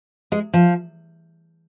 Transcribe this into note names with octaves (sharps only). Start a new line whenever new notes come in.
G#3
F3